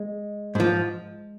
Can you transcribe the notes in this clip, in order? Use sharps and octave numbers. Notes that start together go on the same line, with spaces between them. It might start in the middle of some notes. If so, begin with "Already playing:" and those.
Already playing: G#3
G#2 F3